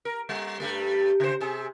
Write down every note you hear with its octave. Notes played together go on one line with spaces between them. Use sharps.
A#4
G3
G2 G3 A3
C#3 C5
C3 G#4